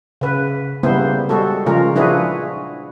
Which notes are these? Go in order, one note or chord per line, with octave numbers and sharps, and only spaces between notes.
C#3 B4
C#3 G3 A#3 B3 E4 C5
G3 G#3 F#4 A4
C#3 F3 G#3 F4 A#4
F3 D4 E4 F#4 G#4 B4